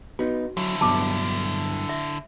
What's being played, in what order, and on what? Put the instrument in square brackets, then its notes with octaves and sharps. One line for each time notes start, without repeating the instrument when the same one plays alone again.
[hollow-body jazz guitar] B3 D#4 [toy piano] F#4
[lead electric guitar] D3 E4 [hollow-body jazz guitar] F#3
[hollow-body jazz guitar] G2 B2 F#3 [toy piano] A5 D6
[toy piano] E5